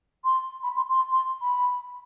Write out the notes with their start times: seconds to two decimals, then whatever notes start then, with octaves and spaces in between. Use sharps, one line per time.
0.24 C6
0.63 B5
0.76 C6
0.90 C6
1.12 C6
1.42 B5